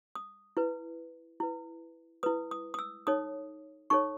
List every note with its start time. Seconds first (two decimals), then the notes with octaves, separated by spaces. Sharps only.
0.15 D#6
0.57 E4 B4
1.40 E4 B4
2.23 E4 B4 D#6
2.51 D#6
2.74 D#6
2.79 E6
3.07 D#4 A4 C#5 D#6
3.90 D#4 A4 C#5 C#6